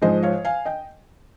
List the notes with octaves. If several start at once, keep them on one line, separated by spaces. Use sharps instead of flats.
G#2 F3 G#3 C5 D#5
C#5 F5
F5 G#5
D#5 G5